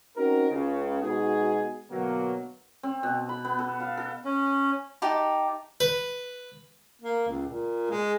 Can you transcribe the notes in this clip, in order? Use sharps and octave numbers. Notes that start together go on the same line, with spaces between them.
C4 C#4 D#4 F#4 A#4
C#2 C#3
B2 G#3 D#4 F#4 G#4
B2 D3 F#3 A#3
C4
B2
B5
B3
A4
F5
A4
C#4
D#4 G4 A5
B4
A#3
C#2
A#2
G#3